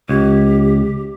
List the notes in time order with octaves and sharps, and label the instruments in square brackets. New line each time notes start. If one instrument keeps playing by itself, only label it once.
[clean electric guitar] C#2 [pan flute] G4